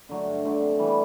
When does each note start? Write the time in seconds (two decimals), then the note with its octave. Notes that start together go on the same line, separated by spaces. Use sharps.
0.09 D3 F#3 A3
0.26 G2
0.45 D3 F#3 A3
0.62 C3
0.79 E3 G3 B3